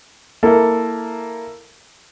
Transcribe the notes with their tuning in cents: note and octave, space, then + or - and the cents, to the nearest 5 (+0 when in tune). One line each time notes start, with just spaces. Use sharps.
A#3 -5 E4 +0 A4 +0